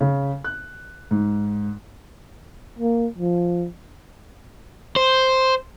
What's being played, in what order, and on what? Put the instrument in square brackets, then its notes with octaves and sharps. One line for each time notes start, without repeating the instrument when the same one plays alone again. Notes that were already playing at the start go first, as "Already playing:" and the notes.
[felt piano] C#3
F#6
G#2
[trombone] A#3
F3
[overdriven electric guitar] C5